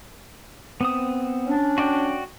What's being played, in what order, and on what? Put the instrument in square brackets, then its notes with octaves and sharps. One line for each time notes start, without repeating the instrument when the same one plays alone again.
[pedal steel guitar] B3 C4 D#6
[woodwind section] C#4 D4
[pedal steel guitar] F#4 D5 G5